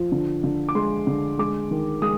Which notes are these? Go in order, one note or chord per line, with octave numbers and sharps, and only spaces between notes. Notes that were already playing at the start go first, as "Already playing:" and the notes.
Already playing: F3
D3
D3
D6
G#3 C6
D3
G#3 D6
D#3
G#3 D#6